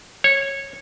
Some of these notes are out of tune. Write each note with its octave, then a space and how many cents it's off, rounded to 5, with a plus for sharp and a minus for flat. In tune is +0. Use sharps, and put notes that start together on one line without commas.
C#5 -15